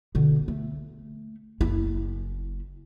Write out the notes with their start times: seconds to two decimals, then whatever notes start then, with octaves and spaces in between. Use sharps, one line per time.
0.15 B2 D3
0.48 A3
1.60 F#1 E4